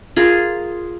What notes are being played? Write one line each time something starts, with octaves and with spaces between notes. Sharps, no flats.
F4 G#4 A#4